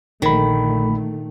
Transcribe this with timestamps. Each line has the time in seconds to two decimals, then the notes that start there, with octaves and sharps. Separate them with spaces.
0.22 A#1 A#2 D3 D#3 A3 B5